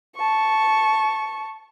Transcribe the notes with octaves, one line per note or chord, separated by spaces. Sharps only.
A5 C#6